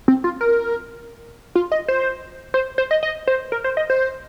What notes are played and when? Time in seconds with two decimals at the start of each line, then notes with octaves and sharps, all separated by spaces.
0.08 C4
0.24 F4
0.41 A#4
1.56 F4
1.72 D#5
1.88 C5
2.54 C5
2.78 C5
2.91 D#5
3.03 D#5
3.28 C5
3.52 A#4
3.64 C5
3.77 D#5
3.90 C5